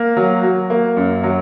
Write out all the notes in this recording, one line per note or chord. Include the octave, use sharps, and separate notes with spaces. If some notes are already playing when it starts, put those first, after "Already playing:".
Already playing: A#3
F#3
F#3
A#3
F#2
F#3